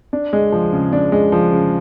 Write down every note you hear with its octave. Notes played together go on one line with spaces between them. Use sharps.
D4
G#3
F3
C#3
D4
G#3
F3
C#3